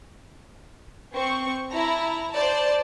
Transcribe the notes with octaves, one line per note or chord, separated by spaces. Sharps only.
C4 C#6
E4 A5 A#5
C5 D5 A5